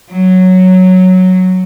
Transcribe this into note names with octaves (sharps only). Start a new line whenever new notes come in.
F#3